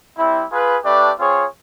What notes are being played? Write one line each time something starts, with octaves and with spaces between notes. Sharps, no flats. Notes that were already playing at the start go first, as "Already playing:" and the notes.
G3 C4 E4
F4 G#4 B4
A3 D4 G4 B4 D5
C4 F4 G#4 C#5